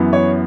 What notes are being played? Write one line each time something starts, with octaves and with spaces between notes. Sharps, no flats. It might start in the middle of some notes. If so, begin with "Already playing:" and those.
Already playing: F#2 E3 B3
C#5